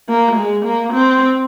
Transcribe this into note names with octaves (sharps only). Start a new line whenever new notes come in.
A#3
G#3
A#3
C4